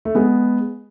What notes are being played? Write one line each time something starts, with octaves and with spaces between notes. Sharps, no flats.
A3
G#3 B3